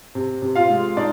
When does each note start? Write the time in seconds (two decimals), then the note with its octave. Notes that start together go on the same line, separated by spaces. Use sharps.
0.15 C3
0.42 C3
0.55 F4 F5
0.70 G#3
0.97 D4 D#4 D5